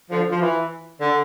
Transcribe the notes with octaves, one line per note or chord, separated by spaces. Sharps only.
D3 F3
F3
E3
D3